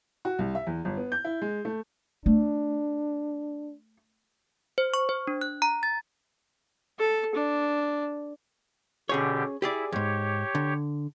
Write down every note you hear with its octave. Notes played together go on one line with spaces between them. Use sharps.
F#4
C2
E5
E2
G1
B3
G6
E4
G#3
A3
A3 D4
C5
C#6
C5
D4
F#6
A#5
A6
A4
D4
B2 D3 C#4 G4 G#4 C#5
E4 G4 G#4 D5
E2 G#2 G4 C#5
D3